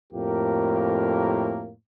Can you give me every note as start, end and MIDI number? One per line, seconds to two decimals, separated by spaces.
0.13 1.72 41
0.13 1.72 45
0.13 1.72 58
0.13 1.72 67
0.13 1.72 70